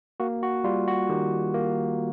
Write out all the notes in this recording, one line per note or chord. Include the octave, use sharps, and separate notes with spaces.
A#3 F#4
F#4
G3 F4
F#4
D#3 G4
A#3